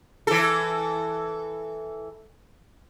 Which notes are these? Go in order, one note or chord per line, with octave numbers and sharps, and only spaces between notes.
E3 A4